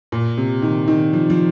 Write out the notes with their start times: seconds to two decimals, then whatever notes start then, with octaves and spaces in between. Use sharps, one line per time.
0.12 A#2
0.37 C3
0.62 D#3
0.88 D#3
1.13 F3
1.30 F3